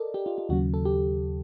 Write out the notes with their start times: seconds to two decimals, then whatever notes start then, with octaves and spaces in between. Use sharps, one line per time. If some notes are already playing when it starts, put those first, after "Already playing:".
Already playing: A4 A#4 D5 D#5
0.14 G4
0.26 F4
0.38 F4
0.49 D#2 C#3 F#3 F#4
0.74 A4
0.85 G4